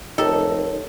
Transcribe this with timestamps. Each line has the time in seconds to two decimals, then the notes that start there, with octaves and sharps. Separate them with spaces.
0.18 F1 D#4 G4 A4 A#4 C#5